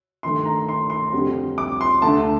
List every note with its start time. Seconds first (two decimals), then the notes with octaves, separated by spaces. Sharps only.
0.23 G2 D#3 A3 C6
0.45 A#5
0.69 C6
0.90 C6
1.12 F2 D3 G3
1.58 D6
1.81 C6
2.02 D2 D3 A3 A5